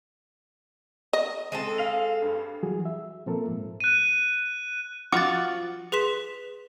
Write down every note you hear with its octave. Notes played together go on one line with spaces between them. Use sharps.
D#5
G#3 C4 A4 D#7
F5 F7
G2
E3 F#3 G3 F#4 G#4
E5
A#2 F3 A#3 C4 A4 A#4
G#2
F#6 D#7
F3 F4 F#4 F#5 D6 A6
G#4 B4 C6 B6 E7